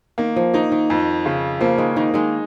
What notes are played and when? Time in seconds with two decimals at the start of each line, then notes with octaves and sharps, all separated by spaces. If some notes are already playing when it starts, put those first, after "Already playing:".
0.18 D#3 A#3
0.36 F3
0.54 D#3 D#4
0.72 D#3
0.90 F2
1.26 C#3
1.61 F3 A#3
1.78 D#3 G#3
1.96 D#3 D#4
2.14 D#3 G#3